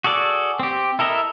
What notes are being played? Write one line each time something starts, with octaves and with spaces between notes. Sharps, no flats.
F#4 G#4 A4 D5
C4 G4
E4 A4 A#4 D#5 E5